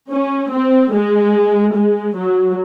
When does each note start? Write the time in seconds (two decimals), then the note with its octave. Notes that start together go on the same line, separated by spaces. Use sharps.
0.11 C#4
0.51 C4
0.92 G#3
1.75 G#3
2.16 F#3